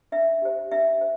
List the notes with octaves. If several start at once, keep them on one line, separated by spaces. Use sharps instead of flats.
D4 E5
G4 C5
D4 E5
C5